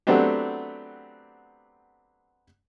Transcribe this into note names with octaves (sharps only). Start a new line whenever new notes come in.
F#3 A3 B3 C4 D4 G4